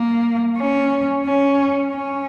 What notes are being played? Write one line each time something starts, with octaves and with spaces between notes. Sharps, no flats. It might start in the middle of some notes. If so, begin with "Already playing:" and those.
Already playing: A#3
C#4
C#4
C#4